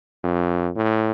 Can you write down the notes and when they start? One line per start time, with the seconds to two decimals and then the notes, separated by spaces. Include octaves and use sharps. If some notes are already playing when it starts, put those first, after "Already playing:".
0.24 F2
0.76 A2